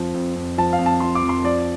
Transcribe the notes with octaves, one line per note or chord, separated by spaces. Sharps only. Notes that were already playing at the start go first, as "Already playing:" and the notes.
Already playing: F2 F3
F2
F2
F3 A5
F5
F2
A5
F3 C6
D6
F2
C6
F3 D5